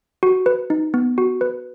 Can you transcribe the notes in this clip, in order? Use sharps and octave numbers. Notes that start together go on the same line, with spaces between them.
F#4
B4
D#4
B3
F#4
B4